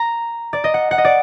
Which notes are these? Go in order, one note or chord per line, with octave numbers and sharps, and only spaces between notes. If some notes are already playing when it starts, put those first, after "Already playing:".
Already playing: A#5
D5
D#5
F#5
F#5
D#5
D5